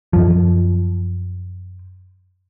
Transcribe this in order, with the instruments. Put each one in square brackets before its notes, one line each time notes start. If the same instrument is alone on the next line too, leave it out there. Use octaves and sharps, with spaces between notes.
[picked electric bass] F#2 F3